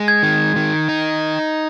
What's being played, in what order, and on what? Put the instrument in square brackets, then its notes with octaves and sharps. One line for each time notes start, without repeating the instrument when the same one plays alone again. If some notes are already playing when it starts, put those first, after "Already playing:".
Already playing: [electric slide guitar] G#3
[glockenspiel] G#6
[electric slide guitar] D#3
D#3
D#4